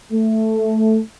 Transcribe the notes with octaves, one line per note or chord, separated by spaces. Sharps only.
A3